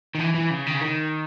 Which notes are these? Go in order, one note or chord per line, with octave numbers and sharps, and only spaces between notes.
D#3
E3
E3
C#3
D#3
C#3
D#3